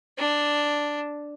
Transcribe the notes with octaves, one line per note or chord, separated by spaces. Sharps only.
D4